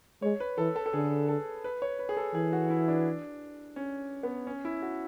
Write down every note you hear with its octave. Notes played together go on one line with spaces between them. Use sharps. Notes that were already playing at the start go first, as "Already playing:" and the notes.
G#3 C#5
B4
E3 A4
A4
A4
D3 G#4
A4
B4
C#5
B4
G#4
A4
E3 G#4
F#4
E4
D4
C#4
B3
C#4
E4
F#4